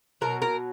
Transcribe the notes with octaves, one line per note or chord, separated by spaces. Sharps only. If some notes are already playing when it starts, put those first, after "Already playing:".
B2 F#3 A#4
A#4